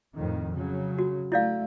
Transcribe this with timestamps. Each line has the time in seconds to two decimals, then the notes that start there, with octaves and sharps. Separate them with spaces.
0.15 F2 A2 D#3
0.53 C#3 F#3
0.98 F#4
1.32 A3 E4 D5 F5